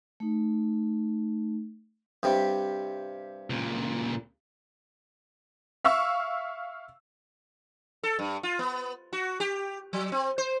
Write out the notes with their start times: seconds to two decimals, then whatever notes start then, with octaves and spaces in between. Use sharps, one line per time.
0.20 A3 D#4
2.23 G2 C3 G3
3.50 C#2 A#2
5.85 E5 F5 C#6 E6
8.03 A4
8.19 G2
8.43 F4
8.59 B3
9.13 F#4
9.40 G4
9.93 F#3
10.12 C4
10.38 C5